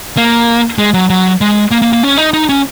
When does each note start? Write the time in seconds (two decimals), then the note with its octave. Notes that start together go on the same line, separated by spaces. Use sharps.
0.17 A#3
0.78 G#3
0.94 F#3
1.10 F#3
1.41 G#3
1.71 A#3
1.82 A#3
1.93 A#3
2.03 C#4
2.18 D#4
2.33 D#4
2.49 C#4